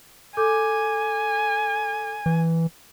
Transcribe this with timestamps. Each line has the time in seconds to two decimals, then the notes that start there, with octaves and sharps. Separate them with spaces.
0.37 A4 G#5 D6 G6
2.26 E3